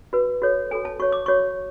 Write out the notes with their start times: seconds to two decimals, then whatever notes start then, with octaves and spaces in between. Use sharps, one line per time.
0.13 F#4 B4
0.42 F#4 A4 C#5
0.71 F#4 A4 C#5 G#5
0.85 A5
0.99 F#4 C#5 C#6
1.12 D6
1.26 F#4 C#5 C#6